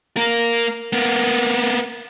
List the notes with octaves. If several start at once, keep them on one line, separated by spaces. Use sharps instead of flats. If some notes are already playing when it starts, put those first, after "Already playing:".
A#3 A#4
A#3 B3